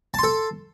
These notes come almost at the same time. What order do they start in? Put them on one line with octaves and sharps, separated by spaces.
A5 C6 A4